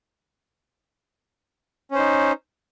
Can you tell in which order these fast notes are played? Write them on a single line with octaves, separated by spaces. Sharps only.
C#4 C5 D#4